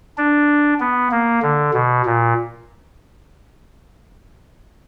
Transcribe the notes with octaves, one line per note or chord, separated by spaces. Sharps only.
D4
B3
A#3
D3
B2
A#2